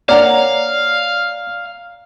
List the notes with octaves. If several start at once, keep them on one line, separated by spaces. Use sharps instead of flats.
A#3 C#5 D5 F5 F#5 A#5